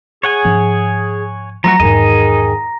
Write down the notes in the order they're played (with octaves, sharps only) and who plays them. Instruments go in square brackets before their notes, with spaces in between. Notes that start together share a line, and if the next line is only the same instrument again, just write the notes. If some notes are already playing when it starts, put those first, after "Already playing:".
[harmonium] G#4 [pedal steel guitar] C#5 F#5 G#5
[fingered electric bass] G#2 F3 C#4
[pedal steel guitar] F3 A3 F#4 [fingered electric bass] F#3 [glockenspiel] A#5 A#6
[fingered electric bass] E2 G#2 [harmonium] D#3 G#4 [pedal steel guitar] D#4 D#5